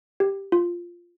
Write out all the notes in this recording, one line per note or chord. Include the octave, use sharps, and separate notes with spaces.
G4
F4